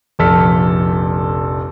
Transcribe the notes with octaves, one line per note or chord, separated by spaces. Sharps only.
F1 A#1 A4 F6 B6